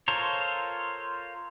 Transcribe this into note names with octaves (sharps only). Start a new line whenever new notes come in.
F4 A4 A#4 C5 C#5